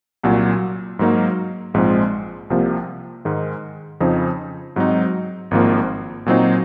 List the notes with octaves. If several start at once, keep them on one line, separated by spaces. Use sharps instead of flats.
C2 A#2 F#3
G#2 F#3 A#3 D#4
A#1 G#2 F3 G#3 C4
C2 C3 F3 A#3
G#2 D#3 G#3
F2 C#3 F3 C4 D#4
G#2 F#3 C4 D#4
G#1 G#2 F3 A#3
A#2 F#3 C4 D#4